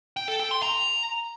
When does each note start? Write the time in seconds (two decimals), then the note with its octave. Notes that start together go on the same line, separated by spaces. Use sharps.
0.17 G5
0.28 A4
0.40 G5
0.51 C6
0.62 A#5